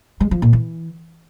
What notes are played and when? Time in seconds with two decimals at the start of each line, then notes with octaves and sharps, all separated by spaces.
0.20 G#3
0.31 F3
0.42 A#2
0.53 E3